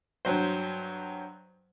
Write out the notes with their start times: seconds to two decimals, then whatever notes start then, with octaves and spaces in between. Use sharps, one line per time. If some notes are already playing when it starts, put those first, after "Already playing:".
0.25 G2 F#3 C5